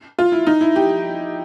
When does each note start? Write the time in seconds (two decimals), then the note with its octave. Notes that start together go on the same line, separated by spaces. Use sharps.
0.19 F4
0.32 E4
0.47 D#4
0.61 E4
0.76 G4